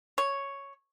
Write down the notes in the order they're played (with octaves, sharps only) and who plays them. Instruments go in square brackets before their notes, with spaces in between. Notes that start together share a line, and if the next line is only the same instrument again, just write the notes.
[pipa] C#5